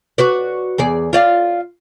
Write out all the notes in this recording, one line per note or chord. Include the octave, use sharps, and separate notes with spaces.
F#4 B4 D5
E2 G#4 D5
F4 D5 F5